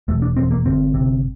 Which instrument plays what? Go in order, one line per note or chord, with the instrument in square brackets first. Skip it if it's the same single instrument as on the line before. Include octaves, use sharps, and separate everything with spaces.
[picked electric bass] E1 A3
D4
E1 C4
A#3
G1 C4
C3